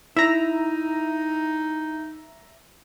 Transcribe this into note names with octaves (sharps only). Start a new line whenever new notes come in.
D#4 E4 E5 A#5